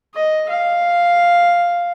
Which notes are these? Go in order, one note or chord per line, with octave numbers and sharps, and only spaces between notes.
D#5
F5